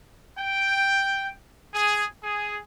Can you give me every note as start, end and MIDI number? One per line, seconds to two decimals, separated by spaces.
0.39 1.31 79
1.74 2.04 68
2.23 2.58 68